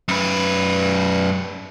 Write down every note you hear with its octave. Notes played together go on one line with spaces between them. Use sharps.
F#2 B4